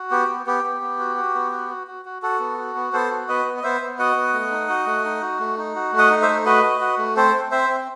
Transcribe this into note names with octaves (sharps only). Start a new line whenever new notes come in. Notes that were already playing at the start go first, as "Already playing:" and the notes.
Already playing: F#4
B3 G4
B3
B3 G4
B3
B3
F#4
F#4
B3
F#4
F#4
F#4
F#4
F#4 A4
B3
F#4
B3
B3 A4 C5
F#4
B3 B4 D#5
B3
D#5
B3 C5 E5
B3
F#4 D#5 F#5
B3
A3
D#4
F#4
A3
D#4
F#4
A3
D#4
F#4
A3
D#5 F#5
D#4
C5 E5
A3
F#4 B4 D#5
F#4
F#4
A3
C4 A4 C5
C4
C4 C5 E5
C4